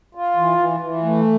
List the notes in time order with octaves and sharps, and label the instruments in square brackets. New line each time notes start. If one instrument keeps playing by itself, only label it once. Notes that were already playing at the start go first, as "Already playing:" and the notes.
[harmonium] F4
E3
E3
E3
A3